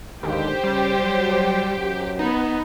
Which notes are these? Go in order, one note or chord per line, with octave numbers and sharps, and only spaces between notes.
D#2 D3 D#3 G#3 G4 C5
C#3 G3 C#4
F#3
F#2 F#3
B3 D#4